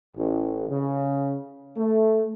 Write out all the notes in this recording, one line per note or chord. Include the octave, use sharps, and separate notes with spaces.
A1
C#3
A3